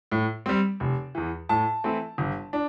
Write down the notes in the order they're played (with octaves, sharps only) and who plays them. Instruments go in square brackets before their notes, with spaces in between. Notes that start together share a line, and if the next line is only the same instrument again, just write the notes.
[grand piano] A2
G3 C4
F1
E2 E3
A2 A5
E3 A3 C4 E4
G1
D4